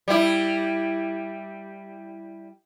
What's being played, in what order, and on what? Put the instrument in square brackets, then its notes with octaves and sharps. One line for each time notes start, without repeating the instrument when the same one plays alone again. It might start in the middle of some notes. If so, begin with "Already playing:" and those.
[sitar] G3 E4